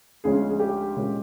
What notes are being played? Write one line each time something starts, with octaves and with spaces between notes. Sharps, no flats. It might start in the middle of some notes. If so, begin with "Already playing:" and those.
D2 D3 F3 G#3 C#4 G#4
G#4
G4
A#2 F3 G#3 C#4